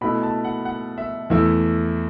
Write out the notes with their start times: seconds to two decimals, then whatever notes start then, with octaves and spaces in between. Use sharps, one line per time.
0.01 B2 A3 E4 B5
0.23 A5
0.44 F#5
0.65 F#5
0.98 E5
1.30 E2 E3 A3 E4